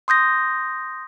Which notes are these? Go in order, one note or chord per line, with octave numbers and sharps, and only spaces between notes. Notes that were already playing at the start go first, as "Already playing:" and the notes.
C6 D#6 G6 A#6